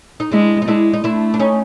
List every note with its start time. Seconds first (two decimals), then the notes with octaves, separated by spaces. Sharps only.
0.20 D#4
0.32 G#3 D4 E4
0.62 D#4
0.68 G#3 D4 E4
0.93 D#4
1.04 A3 D4 E4
1.34 D4
1.40 C#4 D#4